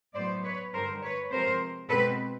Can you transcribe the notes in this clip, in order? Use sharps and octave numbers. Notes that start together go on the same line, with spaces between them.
A2 F#3 B3 C5 D5
B4 C#5
G2 D3 G3 A#4 C5
B4 C#5
C3 F3 G#3 A#4 C5
B2 G#3 C4 A4 B4